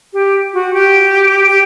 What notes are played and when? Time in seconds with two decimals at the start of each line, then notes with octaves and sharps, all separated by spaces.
0.13 G4
0.54 F#4
0.74 G4
1.47 G4